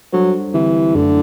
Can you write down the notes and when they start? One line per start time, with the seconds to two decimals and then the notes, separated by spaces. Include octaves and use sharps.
0.13 F#3 G3 D4 A4 C5
0.54 D3 E3 G3 C4 G4
0.95 F#2 D3 F#3 A3 E4